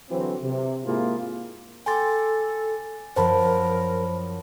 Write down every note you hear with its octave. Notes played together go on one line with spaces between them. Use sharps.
D3 E3 F#3 C4
C3
G#2 C3 A#3 E4 F4 G#4
A4 G5 G#5 C6 D6 A6
F#2 F3 A#4 C5 A5 B5